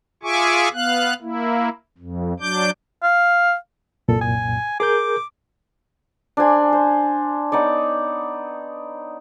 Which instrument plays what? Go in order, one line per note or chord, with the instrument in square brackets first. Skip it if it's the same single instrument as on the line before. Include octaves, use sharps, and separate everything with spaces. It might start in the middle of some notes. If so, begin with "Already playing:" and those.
[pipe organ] F4 G#4 E5 G#5 C#6 D6
B3 F5 F#6
A#3 E4
F2
F#3 D4 D6 G6
[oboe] F5
[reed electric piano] C2 F#2 A#2 [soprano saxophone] A4
[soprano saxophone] G#5
[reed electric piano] G#4 A#4 G6 [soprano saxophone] D6
[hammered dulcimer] D4 C5 G#5
C5
B3 D#4 C#5 D5